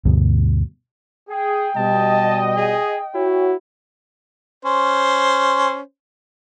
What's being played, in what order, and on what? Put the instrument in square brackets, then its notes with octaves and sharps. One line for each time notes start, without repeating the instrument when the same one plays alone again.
[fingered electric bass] D2 G2 B2
[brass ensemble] G#4 [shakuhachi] G5
[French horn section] B2 G3 [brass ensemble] D#5 [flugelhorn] A5
[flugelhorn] G#4
[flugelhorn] E4 [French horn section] F#4 C#5
[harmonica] C#4 C5